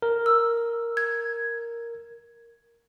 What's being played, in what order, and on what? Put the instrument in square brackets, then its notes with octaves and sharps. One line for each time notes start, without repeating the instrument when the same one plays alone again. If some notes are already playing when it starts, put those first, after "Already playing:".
[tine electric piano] A#4
[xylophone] E6
G#6